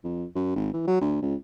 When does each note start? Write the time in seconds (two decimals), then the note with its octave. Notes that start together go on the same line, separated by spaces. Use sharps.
0.04 F2
0.36 F#2
0.56 G#1
0.73 E3
0.88 F#3
1.01 D2
1.22 C#2